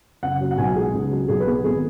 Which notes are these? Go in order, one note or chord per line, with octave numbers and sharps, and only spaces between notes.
F#1 F#5
F#3
F#5
B1 G#5
G#3 G#4
C#2
F#3
B1 G#4
B4
B3 G#4
G#1 G#4